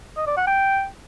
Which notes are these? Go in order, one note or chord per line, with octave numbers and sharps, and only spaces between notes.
D#5
D5
F#5
G5